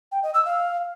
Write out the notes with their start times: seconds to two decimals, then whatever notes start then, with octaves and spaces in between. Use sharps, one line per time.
0.12 G5
0.23 D#5
0.34 E6
0.45 F5